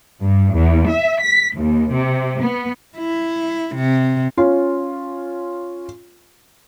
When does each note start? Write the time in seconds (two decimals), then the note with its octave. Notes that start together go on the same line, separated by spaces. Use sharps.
0.21 G2
0.55 E2
0.90 E5
1.21 B6
1.56 D#2
1.93 C3
2.41 B3
2.97 E4
3.76 C3
4.37 C#4 F4